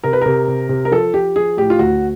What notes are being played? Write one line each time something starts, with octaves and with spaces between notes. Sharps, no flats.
C3 A#4
B4
C3 A#4
C3
C3
A#4
F3 A4
F3 G4
F3 G#4
A2 G4
F4
D2 F#4